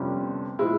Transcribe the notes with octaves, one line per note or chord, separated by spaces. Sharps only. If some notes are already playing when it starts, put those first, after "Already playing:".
Already playing: G1 F2 C3 G3 C#4
A#2 F3 G#3 E4